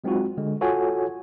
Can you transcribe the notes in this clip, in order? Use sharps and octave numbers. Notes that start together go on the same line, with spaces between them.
F#3 G#3 C4 D#4 F4 F#4
D3 G#3
F4 F#4 A4 C#5 F#5 G#5